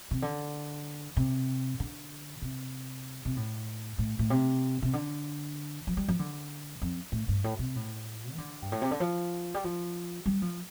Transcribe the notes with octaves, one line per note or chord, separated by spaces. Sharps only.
C3
D3
C3
D3
C3
C3
A2
A2
A2
C3
C3
D3
F3
G3
F3
D3
F2
A2
G2
A2
C3
A2
F3
D3
G2
A2
C3
D3
F3
G3
F3
G3
F3